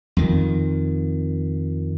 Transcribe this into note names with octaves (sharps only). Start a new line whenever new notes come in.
F2 D#3